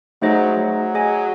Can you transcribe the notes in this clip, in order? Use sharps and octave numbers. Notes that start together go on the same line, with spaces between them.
F#3 A3 D#4 G#4 C5 D#5
F#3
G#4 D#5 G#5